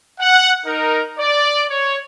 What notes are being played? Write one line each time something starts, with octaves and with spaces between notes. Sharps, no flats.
F#5
D#4 A#4
D5
C#5